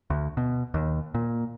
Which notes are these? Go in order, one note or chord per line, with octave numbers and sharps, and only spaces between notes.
D2
B2
D#2
A#2